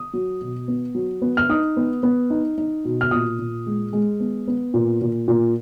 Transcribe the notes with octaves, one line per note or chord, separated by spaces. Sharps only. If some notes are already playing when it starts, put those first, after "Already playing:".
Already playing: D#6
F#3
B2
B3
F#3
B3
F6
D#4 D#6
B3
B3
D#4
D#4
B2
F6
A#2 D#6
A#2
G#3
G#3
B3
B3
A#2
A#2
A#2